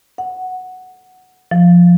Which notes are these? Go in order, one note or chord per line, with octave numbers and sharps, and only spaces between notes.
F#5
F3